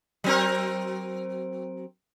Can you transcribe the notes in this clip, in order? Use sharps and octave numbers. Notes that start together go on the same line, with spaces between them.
F#3 C4 A#4